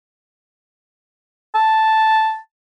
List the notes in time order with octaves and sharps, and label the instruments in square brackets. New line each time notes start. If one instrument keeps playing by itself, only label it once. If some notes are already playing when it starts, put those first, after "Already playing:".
[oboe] A5